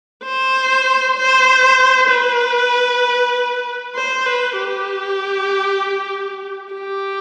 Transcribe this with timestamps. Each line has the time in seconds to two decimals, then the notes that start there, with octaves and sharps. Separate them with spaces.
0.24 C5
1.17 C5
2.10 B4
3.95 C5
4.26 B4
4.57 G4
6.73 G4